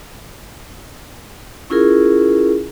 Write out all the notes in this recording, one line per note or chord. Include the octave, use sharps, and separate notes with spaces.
C#4 E4 F4 G#4 A#4